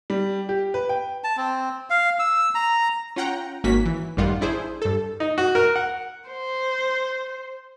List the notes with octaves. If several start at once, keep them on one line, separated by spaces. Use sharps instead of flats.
G3
G4
B4
G5
A5
C4
F5
E6
A#5
C#4 F4 F#5 G5 A#5
G#1 A#3 C#4 F#4 B6
E3
A1 F#2 D#3 G3 F4 F#5
D4 E4 G#4 C5
G2 A4
D#4
F#4
A#4
F#5
C5